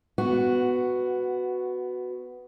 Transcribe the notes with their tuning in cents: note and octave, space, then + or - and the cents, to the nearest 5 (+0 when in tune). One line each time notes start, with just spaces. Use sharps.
B3 +10 F#4 +0